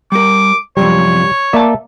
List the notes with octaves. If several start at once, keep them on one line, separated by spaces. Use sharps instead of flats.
G3 A#4 D6
C2 F#2 F3 G3 C#5
A#3 D5 E5 A5